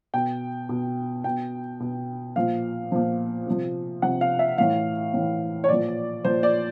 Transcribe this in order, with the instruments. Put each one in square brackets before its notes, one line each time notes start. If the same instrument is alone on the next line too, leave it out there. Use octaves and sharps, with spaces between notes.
[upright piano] B2 G5
B2
B2 G5
B2
A#2 F3 F5
A#2 F3
C3 F3
C3 F3 F#5
F5
E5
A2 E3 F5
A2 E3
C#5
A#2 F3 D5
A#2 F3 C5
D5